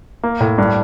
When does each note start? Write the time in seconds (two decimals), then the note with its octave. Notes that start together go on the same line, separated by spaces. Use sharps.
0.23 A#3
0.40 A2
0.58 G2